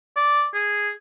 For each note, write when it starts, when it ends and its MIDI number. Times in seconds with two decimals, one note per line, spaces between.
0.16 0.46 74
0.54 0.90 68